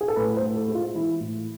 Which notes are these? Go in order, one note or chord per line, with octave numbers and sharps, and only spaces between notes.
G#4
A4
A2 B4
C5
A2
A4
G#3
F4
E3 E4
A2